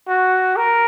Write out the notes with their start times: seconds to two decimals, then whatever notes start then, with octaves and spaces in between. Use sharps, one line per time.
0.08 F#4
0.56 A#4